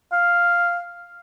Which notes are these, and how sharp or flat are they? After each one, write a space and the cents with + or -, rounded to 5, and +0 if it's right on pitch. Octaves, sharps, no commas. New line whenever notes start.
F5 +0